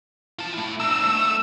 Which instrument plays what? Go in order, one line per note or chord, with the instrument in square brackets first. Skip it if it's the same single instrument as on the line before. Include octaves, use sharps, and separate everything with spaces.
[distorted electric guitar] F4 A5
A3 E4
[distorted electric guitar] D4 D#4 [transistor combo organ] E6
[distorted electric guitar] A3